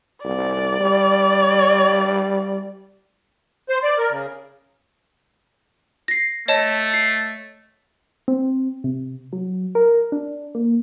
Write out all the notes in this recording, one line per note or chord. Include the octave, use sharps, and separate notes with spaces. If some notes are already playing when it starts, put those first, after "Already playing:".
C2 D5
G3
C5
D5
A#4
C#3
A#6 C7
A3 C#5 D#5 A5
C7
C4
C3
F#3
A#4
D4
A#3